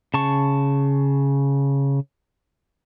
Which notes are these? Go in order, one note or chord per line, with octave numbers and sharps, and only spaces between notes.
C#3 A5 C#6